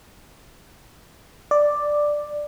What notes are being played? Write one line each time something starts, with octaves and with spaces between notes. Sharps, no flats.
D5